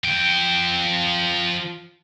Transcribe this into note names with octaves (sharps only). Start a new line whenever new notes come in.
F3 G5